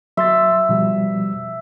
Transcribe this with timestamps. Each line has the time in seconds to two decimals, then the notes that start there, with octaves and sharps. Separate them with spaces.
0.17 F#3 E5 C6 A6
0.69 B2 F3 G3